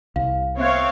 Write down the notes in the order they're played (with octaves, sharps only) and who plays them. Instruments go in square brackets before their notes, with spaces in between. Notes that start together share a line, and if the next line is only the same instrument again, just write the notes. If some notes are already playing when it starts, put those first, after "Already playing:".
[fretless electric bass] C2 [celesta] F5
[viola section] C4 C#5 F5 [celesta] E5 F#6 G#6